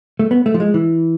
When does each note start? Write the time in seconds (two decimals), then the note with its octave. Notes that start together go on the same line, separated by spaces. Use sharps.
0.19 A3
0.31 B3
0.46 A3
0.54 F3
0.60 G#3
0.74 E3